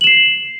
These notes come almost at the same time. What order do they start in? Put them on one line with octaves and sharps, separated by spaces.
F#7 E7 C7